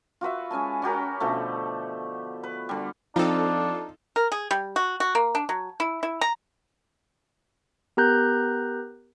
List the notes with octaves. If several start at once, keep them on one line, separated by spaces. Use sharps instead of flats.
F4 F#4 B4 E5
G#3 C#4 G#5 A5
C#4 F#4 G4 A#4
B2 D3 F3 A3
B4
D3 G3
F3 C4 D4 D#4 F4 A4
A#4
G#4
G3
F#4
F#4
A#3
D4
F#3
E4
E4
A#5
B3 G4 A#4 A#5 F#6 G6